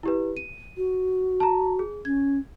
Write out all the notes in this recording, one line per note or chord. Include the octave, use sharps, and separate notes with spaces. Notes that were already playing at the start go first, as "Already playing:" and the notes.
E4 G4 B4
D#7
F#4
A5 A#5
G#4
C#4 G#6